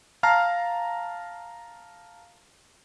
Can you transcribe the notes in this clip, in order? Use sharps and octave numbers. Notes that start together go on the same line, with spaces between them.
F5 A5 A#5 F6 C7